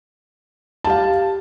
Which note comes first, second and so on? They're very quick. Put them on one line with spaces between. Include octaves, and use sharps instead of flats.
A5 G4 F5